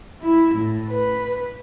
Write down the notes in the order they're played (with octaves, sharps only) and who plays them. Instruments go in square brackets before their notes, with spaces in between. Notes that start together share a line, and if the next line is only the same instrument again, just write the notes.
[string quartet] E4
A2
B4